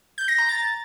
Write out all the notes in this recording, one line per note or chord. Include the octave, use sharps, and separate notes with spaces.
G6
A#6
A#5
A6